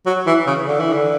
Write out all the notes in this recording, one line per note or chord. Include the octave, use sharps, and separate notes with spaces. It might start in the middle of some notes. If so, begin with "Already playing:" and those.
F#3
E3
C#3
D3
E3
D3